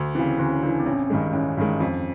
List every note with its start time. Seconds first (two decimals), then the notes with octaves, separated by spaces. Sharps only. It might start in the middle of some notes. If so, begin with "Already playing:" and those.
Already playing: D2
0.15 C#3 E3 C4
0.39 D2 C#4
0.62 C#3 E3 D4
0.79 C4
0.86 A1 C#4
1.10 G2 D#3 G#3
1.33 A1 C#4
1.57 G2 D#3 G#3
1.80 F2